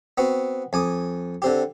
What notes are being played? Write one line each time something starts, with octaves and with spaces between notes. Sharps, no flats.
B3 C4 F#4
F2 G#5 D6 D#6
D3 C4 G4